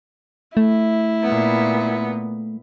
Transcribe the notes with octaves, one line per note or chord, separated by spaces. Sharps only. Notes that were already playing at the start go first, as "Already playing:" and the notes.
A3 E4
A#2 B3